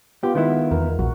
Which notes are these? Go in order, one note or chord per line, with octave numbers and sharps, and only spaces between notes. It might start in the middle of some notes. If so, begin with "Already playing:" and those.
B3 F4 G4
D#3 G#3 B3 E4
E2 A#4
A#1 F#4